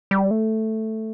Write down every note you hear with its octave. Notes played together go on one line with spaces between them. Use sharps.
G3
A3